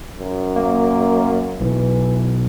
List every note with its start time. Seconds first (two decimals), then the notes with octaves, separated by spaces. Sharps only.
0.19 F#2
0.56 A#3
1.61 B1 E3